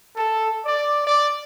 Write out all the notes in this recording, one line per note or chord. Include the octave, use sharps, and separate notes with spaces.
A4
D5
D5